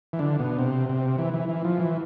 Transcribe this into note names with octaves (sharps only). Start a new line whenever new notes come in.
E3
D3
B2
C3
C3
E3
E3
E3
F3
E3